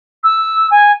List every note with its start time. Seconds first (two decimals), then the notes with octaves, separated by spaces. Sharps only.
0.24 E6
0.71 G#5